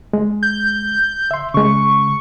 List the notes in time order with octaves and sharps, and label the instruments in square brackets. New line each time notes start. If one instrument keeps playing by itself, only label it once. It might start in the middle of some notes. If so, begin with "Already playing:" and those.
[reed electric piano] G#3
[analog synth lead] G6
[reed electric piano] E5 C6
[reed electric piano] C#3 G#3 [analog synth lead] C#6